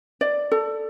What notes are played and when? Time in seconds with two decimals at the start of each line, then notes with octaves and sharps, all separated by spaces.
0.21 D5
0.52 A4